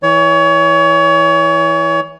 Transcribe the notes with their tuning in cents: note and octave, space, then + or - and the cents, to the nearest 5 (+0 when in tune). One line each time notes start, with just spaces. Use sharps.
E3 -10 C#5 +30